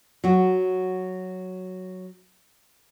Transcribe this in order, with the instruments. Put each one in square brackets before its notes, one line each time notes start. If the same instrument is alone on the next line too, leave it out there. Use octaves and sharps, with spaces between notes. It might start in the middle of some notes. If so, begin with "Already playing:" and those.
[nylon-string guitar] F#3 F#4